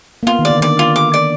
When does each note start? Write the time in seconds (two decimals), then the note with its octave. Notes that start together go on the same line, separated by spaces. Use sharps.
0.23 A#3
0.27 B3 F4
0.39 D#3
0.45 D5
0.50 D3
0.61 D#3 D5
0.79 F4
0.96 D6
1.14 D5